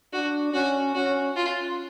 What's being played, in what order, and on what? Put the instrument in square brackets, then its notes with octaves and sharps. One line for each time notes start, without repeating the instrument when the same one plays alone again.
[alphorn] D4 [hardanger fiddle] F#4
[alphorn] C#4 [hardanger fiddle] F#4
[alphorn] C#4 [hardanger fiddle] F#4
[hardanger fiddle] F4